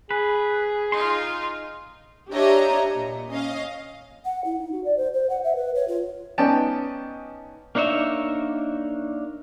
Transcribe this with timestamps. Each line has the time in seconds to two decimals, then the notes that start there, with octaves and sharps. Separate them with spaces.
0.11 G#4 B4
0.92 D#4 F4 C6
2.31 D4 G4 C#5 D#5 E5 A#5
2.98 A#2
3.30 C#4 D#5 F5
4.25 F#5
4.45 E4
4.59 D#4
4.72 F#4
4.85 D5
4.97 C5
5.14 C5
5.30 F#5
5.44 E5
5.56 B4
5.75 C#5
5.88 F4
6.38 B3 C#4 D#4 D5 G5 A5
7.75 A#3 D4 D#4 C#5 E5